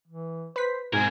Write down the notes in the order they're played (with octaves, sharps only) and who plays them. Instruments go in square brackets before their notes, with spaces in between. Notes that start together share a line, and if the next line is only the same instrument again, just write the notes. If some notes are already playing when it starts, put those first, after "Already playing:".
[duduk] E3
[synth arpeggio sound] B4 B6 [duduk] C5
[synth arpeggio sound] G#2 [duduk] B2 [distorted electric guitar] C4 A#4 [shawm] G#5